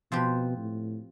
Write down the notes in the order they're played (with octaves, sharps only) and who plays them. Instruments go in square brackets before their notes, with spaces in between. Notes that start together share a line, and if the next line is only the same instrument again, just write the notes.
[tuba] B2 [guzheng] F3 C4 G4 B4
[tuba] A2